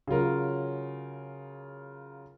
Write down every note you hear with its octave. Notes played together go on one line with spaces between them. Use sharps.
C#3 F#3 F4 A#4